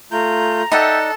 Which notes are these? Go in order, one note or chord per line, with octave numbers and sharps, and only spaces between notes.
A3 F4 A#5 G6
D#4 A4 D5 E5 F#5 G5